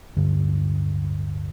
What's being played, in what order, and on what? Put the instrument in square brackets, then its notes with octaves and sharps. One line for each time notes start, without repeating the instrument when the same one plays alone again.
[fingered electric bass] D1 G2 D3